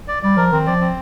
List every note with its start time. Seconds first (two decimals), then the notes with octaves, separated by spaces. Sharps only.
0.08 D5
0.22 G3 D5
0.37 F3 A#4
0.52 D#3 C4
0.67 F3 D5
0.81 C4